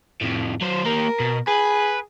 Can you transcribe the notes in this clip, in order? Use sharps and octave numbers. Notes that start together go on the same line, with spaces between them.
F2 A2
F#3 C5
A#3 G4 A#4
B2
G#4 B4